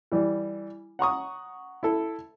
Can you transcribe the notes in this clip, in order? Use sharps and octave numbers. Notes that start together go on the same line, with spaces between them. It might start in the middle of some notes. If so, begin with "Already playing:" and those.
E3 G3
F#5 A#5 C#6 D#6
E4 A4